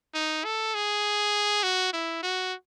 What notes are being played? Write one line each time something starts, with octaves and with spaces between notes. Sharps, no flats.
D#4
A4
G#4
F#4
E4
F#4